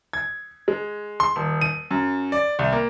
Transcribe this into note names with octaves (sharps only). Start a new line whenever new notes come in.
G#6
G#3
C6
D#1
D#7
F#2
D5
C2
A#3